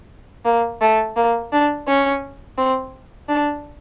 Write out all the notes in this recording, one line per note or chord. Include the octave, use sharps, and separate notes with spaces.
A#3
A3
A#3
D4
C#4
C4
D4